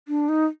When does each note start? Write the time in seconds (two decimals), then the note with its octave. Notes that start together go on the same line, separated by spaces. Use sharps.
0.08 D4
0.29 D#4